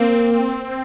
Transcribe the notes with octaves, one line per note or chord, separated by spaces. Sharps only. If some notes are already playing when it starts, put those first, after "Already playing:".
Already playing: A#3 C4